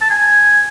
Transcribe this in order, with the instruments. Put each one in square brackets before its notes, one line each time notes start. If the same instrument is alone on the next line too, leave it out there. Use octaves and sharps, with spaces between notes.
[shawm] A5
G#5